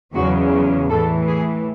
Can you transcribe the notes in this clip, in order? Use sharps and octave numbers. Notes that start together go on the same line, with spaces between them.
E2 C#3 F#3 F#4
A2 E3 A4
G#4